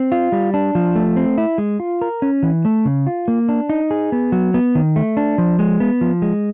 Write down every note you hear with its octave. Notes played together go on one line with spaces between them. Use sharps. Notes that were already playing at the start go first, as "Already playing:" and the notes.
Already playing: C4
F4
G3
D4
F3
A3
C4
E4
G#3
F4
A#4
C#4
E3
A3
C#3
F4
A#3
D4
D#4
G#4
B3
F#3
B3
D#3
A3
D4
F3
G#3
B3
F3
G#3